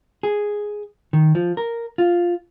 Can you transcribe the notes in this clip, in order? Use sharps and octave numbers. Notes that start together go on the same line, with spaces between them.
G#4
D#3
F3
A#4
F4